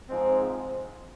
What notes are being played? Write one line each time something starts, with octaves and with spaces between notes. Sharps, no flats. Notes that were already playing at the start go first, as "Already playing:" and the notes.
G#2 F3 G#3 C4